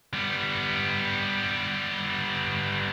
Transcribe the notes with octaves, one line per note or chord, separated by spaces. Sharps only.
G3 B3